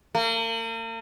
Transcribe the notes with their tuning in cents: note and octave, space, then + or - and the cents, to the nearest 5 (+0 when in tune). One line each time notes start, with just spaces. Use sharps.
A#3 -40